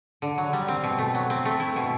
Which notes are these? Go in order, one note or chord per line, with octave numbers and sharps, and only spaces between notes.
D3
F#3
G3
C4
B2
A3
F#3
C4
A3
E4
B2